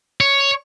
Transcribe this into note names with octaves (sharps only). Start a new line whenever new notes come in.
C#5